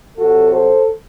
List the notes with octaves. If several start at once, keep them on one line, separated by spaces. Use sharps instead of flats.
C3 F#3 F#4 A4
A4 C5